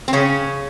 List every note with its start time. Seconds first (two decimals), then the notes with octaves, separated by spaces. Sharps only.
0.08 C4
0.13 C#3 C#4